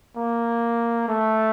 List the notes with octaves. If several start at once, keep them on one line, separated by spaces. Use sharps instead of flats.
A#3
A3